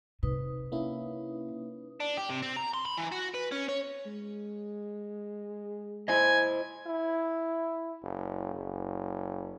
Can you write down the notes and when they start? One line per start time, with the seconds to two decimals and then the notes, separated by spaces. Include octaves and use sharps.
0.23 C3 D#4 B4 D#6
0.72 A#3 C#4 E4
2.00 D4
2.17 G4
2.30 C3
2.42 C4
2.57 A#5
2.74 C6
2.86 B5
2.98 E3
3.12 F#4
3.34 B4
3.52 C#4
3.69 C#5
4.06 G#3
6.08 E4 C5 D#5 G#5
6.87 E4
8.02 F#1
8.54 F#1